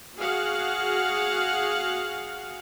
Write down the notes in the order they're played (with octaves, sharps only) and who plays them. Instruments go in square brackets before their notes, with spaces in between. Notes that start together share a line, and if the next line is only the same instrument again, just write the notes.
[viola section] F#4 G#4 F5 F#5